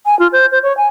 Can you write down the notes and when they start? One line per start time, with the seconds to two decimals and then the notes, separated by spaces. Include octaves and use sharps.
0.06 G#5
0.19 F4
0.33 C5
0.52 C5
0.63 C#5
0.77 G#5